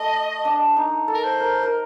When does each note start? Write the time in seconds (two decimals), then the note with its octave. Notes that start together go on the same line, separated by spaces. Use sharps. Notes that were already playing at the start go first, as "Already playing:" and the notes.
Already playing: A3 D#5
0.45 D4
0.77 D#4
1.08 A4
1.15 A#4
1.24 C5
1.40 A#4
1.63 A#4